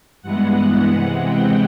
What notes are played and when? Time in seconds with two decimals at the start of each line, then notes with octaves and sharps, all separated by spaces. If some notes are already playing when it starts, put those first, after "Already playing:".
0.22 G2 E3 G#3 B3 F#5
0.89 C3 E3 G#3 F#5
1.23 G5